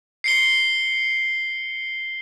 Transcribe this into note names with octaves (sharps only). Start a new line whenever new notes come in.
C7 C#7 G7